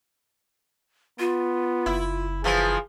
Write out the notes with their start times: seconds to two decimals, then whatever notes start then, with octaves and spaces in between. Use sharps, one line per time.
1.19 B3 F4
1.86 F#1 E4
2.44 E3 F3 G#4